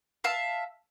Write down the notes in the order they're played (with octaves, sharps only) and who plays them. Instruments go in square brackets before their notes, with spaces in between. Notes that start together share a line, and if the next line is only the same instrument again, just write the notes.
[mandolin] E5 F5 A5